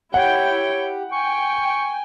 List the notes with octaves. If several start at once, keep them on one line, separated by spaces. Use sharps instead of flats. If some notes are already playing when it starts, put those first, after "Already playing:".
E4 G4 C#5 F#5 G5
G5 G#5 C#6